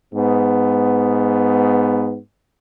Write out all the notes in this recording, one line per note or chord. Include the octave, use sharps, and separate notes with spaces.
G#2 B3